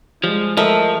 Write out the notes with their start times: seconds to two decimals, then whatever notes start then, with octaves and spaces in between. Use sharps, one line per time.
0.24 F3 G3 G#3
0.57 F3 A3 A#4 D#5